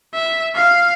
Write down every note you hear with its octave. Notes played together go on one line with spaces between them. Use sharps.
E5
F5